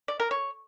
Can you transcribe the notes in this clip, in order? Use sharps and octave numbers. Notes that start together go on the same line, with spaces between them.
D5
A#4
C#5